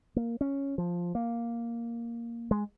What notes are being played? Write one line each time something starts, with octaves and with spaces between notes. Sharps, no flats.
A#3
C#4
F3
A#3
G#3